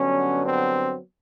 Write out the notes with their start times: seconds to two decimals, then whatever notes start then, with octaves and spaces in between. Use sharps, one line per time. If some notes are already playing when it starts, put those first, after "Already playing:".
Already playing: G2 D3 F#3 B3 C#4
0.45 C4